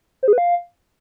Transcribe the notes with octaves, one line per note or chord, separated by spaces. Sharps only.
C5
G#4
B4
F5